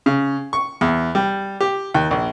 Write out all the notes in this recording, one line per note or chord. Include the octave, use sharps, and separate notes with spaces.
C#3
C#6
E2
G3
G4
D#2
A#1